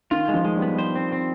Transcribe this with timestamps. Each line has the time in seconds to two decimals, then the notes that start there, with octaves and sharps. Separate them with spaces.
0.11 D#3 F4
0.29 G#3
0.34 F3
0.45 G#3
0.56 G3
0.62 B3
0.79 C5
0.96 C4
1.12 C4